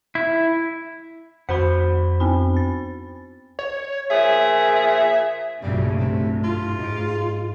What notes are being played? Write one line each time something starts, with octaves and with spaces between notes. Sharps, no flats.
E4
F2 F#4 C5 F#5 B5 B6
B3 C4 B5
A6
C#5
A#2 F3 G#4 E5
B1 G2 A#2 C#3 F#3 G3 A3
A2 C3 A4
F4
G#2 D7